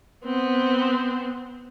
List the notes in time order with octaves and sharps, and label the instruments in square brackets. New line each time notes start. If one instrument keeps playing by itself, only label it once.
[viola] B3 C4